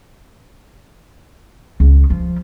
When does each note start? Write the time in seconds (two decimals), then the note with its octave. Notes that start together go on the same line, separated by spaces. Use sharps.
1.80 C#2
2.10 F3